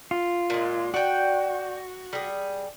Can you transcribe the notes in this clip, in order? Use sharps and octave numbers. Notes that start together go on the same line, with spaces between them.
F4
A#2 G#3
F#4 D5 G5
G3 G#4